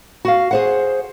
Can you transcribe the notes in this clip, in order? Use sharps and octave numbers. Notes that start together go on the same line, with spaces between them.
F#4 F5
G#4 C5 F#5